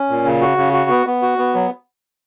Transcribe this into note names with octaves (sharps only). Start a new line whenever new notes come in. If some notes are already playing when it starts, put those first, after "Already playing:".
Already playing: C#4
A#2
C#3
F#4
C#3
F#4
B3
B3
F#4
B3
F#3